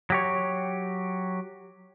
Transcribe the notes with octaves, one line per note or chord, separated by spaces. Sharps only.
F#3 G4 C#5